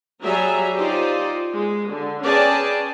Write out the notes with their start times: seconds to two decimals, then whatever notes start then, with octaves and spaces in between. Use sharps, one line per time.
0.23 F#3 G3 G#4 E5 A#5
0.77 D#4 F4 G4 C5 D5 D#5
1.55 G#3
1.89 D3
2.24 C#4 G#4 B4 D5 G5 A5